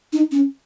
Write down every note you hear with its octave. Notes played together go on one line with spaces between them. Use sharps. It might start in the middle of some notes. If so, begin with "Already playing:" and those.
D#4
C#4